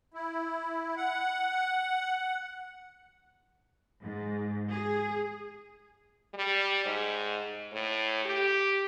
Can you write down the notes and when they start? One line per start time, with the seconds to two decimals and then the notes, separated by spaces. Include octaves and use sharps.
0.14 E4
0.97 F#5
4.02 G#2
4.70 G#4
6.34 G3
6.85 G#2
7.72 A2
8.25 G4